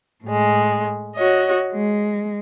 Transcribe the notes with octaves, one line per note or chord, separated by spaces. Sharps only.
A2 G#3
F#4 C#5 D#5
G#3